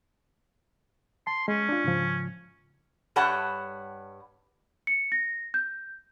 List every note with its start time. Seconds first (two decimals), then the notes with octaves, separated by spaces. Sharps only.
1.27 A5 C6
1.48 G#3 C#4
1.69 D4 F4
1.84 G#2 C#3 F3
3.16 G2 G3 C#5 F#5 A5
4.87 C#7
5.12 A#6
5.54 G6